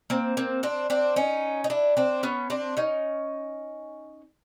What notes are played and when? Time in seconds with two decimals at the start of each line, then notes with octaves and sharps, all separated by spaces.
0.10 A#3 C4
0.37 A#3 C4
0.63 C4 D4
0.90 C4 D4
1.16 C#4 D#4
1.64 D#4
1.70 D4 E4
1.97 C4 D4
2.23 B3 C#4
2.50 C4 D4
2.77 C#4 D#4